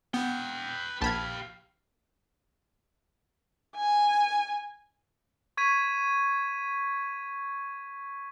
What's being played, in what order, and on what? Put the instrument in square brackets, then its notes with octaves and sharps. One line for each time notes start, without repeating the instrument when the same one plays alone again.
[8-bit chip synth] B3 [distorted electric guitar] B4 G5
[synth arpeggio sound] A#1 [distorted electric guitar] G4 F5 [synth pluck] A5 B5 G#6
[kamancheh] G#5
[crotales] C#6 G#6 B6 D#7